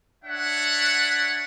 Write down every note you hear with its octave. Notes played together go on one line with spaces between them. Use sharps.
D4 C#5 E5 F#5